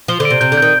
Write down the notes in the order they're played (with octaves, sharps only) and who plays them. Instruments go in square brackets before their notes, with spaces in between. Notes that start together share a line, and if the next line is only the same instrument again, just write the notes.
[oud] F3 [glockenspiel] G7
[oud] D3
[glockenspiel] D7
[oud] C3
[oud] C3 [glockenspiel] G6
[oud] D3
[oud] D#3 [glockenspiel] G6